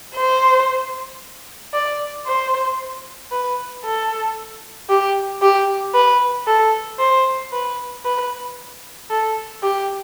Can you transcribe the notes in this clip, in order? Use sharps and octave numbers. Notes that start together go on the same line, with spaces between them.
C5
D5
C5
B4
A4
G4
G4
B4
A4
C5
B4
B4
A4
G4